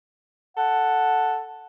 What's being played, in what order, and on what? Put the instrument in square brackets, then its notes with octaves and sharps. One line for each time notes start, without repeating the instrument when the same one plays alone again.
[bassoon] A4 [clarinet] F#5